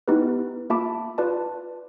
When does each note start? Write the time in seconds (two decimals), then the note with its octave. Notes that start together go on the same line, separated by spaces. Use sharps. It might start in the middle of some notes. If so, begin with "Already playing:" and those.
0.08 B3 D#4 E4 G4 B4
0.70 A#3 F4 E5 A5 B5 D6
1.18 F4 B4 D5 A5